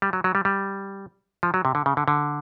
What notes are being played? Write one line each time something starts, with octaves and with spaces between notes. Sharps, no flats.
G3
F#3
F#3
G3
G3
F3
F#3
C3
D3
C#3
D3
D3